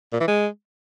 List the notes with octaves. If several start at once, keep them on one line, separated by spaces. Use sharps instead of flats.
A#2
E3
G#3